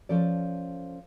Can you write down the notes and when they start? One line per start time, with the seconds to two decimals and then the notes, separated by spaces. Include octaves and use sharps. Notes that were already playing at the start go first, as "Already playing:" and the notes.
0.09 F3 C#4 A4 D5